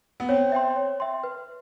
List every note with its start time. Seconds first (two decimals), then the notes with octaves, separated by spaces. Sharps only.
0.20 B3
0.29 C4 C#5
0.52 E5 G5 C6
0.76 C#5
1.00 E5 G5 C6
1.24 B4